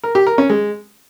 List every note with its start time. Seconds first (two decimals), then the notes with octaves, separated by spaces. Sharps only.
0.04 A#4
0.15 G4
0.27 A#4
0.38 C#4
0.50 G#3